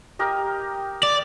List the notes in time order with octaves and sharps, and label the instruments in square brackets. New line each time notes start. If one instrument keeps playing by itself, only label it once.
[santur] G4 A#4 D#5
[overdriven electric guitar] D5